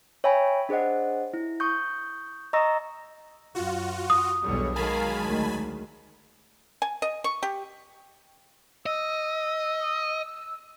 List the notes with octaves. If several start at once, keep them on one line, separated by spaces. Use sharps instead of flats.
C#5 E5 G5 G#5 B5
D4 G#4 C5 D#5 F#5
E4
C#6 D#6 G6
D#5 A#5 C#6 D#6 E6 A#6
F#2 F4 F#4
D#6
B1 E2 B2 D3 G3 C#5
D#3 F#3 G#3 A#4 F5 G#5 A5 B5
D2
G#5
D#5
C#6
G4
D#5 E6